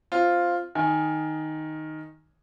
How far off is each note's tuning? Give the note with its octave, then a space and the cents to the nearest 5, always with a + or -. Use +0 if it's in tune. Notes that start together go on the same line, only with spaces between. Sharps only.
C4 +0 F4 +0
D#3 +0 G#5 +0